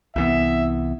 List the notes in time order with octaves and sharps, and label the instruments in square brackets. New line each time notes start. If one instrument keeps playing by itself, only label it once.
[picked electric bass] C2 E3 B3 [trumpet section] E5